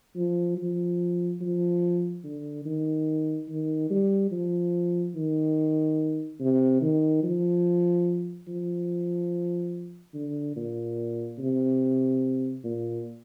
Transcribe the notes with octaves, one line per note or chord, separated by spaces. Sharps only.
F3
F3
F3
D3
D#3
D#3
G3
F3
D#3
C3
D#3
F3
F3
D3
A#2
C3
A#2